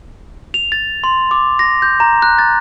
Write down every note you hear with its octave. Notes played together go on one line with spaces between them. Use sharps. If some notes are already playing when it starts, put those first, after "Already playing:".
F7
A6
C6
D6
A#6
G6
A#5
F#6
A6